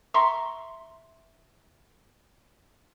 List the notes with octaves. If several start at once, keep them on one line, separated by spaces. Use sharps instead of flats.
E5 A#5 C6 C#6